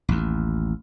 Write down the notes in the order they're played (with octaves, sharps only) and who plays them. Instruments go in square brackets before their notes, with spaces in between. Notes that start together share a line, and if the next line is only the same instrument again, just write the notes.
[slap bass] A1 D#2